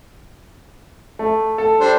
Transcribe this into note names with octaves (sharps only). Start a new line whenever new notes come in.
A3
A4
G3 D4 C5